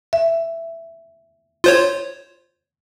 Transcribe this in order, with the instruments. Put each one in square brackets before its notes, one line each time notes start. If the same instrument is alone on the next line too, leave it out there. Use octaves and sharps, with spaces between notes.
[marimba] E5
[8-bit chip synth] F4 C5 C#5